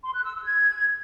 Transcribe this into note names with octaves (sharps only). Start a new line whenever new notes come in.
C6
F#6
E6
E6
G#6